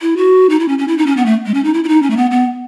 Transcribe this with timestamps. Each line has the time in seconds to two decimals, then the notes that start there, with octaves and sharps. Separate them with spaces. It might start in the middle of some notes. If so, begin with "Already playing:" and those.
0.02 E4
0.17 F#4
0.50 D#4
0.60 E4
0.68 C#4
0.78 C#4
0.88 E4
0.98 D#4
1.06 C#4
1.17 B3
1.26 A3
1.46 G#3
1.54 C#4
1.64 D#4
1.74 E4
1.84 E4
1.89 D#4
2.03 C#4
2.10 A3
2.17 B3
2.31 B3